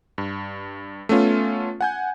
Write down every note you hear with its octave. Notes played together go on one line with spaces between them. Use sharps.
G2
A3 B3 C#4 F4
F#5 G#5 G6